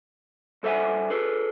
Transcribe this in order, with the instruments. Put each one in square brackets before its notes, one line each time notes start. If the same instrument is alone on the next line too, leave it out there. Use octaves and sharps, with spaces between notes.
[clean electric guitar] G2 A4 C5 E5 F#5 G#5
G#4 A4 B4